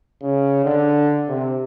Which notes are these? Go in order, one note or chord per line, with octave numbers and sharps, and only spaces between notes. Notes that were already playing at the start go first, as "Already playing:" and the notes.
C#3
D3
C3